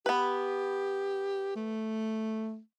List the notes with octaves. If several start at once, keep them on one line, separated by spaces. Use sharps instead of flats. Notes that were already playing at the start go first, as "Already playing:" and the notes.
B3 G4 B4
A3